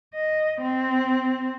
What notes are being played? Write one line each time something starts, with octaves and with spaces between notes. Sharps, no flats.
D#5
C4